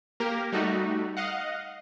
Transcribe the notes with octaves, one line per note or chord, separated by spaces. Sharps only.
A#3 G4 A#4
G3 A3 D#4 F#4
D#5 F5 F#5